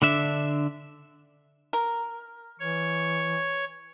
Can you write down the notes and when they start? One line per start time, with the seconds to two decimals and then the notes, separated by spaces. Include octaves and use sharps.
0.02 D3 D4 E5
1.73 A#4
2.60 E3 C#5